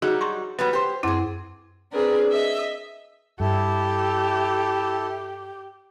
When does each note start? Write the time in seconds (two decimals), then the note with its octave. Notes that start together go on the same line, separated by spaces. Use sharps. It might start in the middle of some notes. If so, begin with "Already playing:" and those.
0.02 F#3 G3 D#4 F#4 G#4
0.21 A#5 C6 C#6
0.59 F#3 G3 B3 B4 B5
0.73 G4 C5
1.03 F#2 C4 E4 G#4
1.92 C4 D4 G#4 A#4 B4
2.30 D#5 E5 E6
3.40 G2 E4 G4 A4